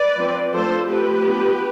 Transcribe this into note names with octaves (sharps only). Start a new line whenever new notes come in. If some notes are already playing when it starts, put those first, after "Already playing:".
Already playing: B4 D5
F3 C4
F3 A3 D4 A4 C5
F3 A3 C4 G4 B4
F3 B3 D4